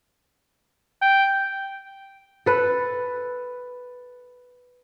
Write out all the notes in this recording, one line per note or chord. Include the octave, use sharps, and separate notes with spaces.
G5
A4 B4